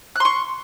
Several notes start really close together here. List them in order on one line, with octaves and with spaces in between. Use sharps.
F#6 C6 C#6